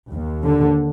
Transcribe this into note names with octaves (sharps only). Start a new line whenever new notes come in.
D#2
D3